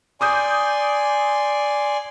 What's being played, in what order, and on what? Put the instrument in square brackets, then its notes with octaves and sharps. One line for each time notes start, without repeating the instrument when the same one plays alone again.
[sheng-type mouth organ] D5 G#5 C6 [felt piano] D6 D#6 G6